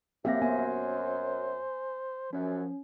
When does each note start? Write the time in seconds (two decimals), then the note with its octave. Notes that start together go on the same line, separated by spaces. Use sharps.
0.25 F#2 A#3 C4 G4 E5 F5 A#6
0.42 B3 C5 G#5
2.33 F#2 F3 C#4